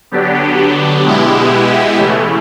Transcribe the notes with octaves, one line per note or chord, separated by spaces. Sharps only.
D3 F#3 B3 D4 G4
B2 G#3 B3 E4 G4
C#3 E3 A3